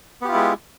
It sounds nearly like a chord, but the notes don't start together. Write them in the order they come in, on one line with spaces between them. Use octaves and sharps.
B3 G4 F4 E4 G#3